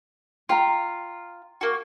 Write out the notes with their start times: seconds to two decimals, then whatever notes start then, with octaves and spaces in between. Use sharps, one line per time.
0.49 F4 G5 A#5
1.61 A#3 F#4